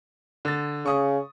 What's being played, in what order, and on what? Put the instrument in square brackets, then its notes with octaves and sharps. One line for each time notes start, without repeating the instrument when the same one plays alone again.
[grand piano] D3 A6
[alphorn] C#3 [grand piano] C#6 D#6